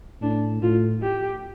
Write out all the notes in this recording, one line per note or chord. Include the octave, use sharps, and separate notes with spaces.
A2 D4
A2 F4
G4